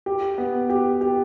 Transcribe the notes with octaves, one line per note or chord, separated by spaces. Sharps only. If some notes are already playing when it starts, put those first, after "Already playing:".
G4
B3
G4
G4